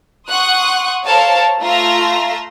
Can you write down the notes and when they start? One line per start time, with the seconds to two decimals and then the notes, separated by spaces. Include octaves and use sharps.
0.28 F#5 C6 C#6 D#6 F#6
1.05 A4 A#4 C5 C#5 F5 A5
1.60 A3 F4 E5 A#5 C6 A#6